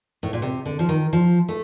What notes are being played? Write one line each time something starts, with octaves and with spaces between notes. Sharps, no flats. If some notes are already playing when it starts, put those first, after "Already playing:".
A2
A#2
C3
D3
F3
D#3
F3
A3